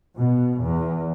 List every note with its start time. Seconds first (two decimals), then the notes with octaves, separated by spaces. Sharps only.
0.18 B2
0.62 E2